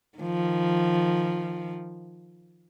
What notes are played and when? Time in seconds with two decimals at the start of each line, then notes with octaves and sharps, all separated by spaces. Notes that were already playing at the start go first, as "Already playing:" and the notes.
0.18 D#3 F3